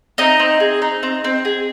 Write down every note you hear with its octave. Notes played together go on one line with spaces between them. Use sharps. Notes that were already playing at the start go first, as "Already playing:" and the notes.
C4 D#4 D#5
C4
G#4
D#4
C4
C4
G#4